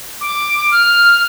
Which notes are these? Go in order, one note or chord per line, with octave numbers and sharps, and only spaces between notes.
D6
F6